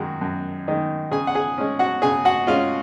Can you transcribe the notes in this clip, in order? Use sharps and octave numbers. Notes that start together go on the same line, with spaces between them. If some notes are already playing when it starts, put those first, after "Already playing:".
Already playing: F#2 D#3 G#3 D#4 F#4
F#2
D#3 G#3 D#4
C#3 G#4 G#5
F#5
G#4 G#5
G#3 C#4
F#4 F#5
C#3 G#4 G#5
F#4 F#5
G#3 C#4 F4 F5